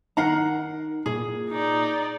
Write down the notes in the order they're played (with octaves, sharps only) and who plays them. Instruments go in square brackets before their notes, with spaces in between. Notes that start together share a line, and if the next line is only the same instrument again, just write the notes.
[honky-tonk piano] D#3 C7 [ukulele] A#4 F#5 A#5
[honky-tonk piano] A#2 [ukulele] G#4
[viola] D#4 D5